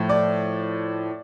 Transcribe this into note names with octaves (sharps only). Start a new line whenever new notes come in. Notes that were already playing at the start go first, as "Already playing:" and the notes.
Already playing: A2 F3
D5